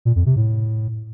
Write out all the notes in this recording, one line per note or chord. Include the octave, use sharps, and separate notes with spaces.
A#2
F2
C3
A2